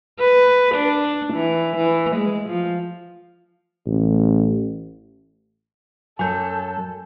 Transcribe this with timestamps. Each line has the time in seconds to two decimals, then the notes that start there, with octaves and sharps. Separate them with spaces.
0.20 B4
0.75 D4
1.34 E3
1.77 E3
2.16 G#3
2.49 F3
3.86 A1
6.19 F#2 F#3 A4 G#5 G6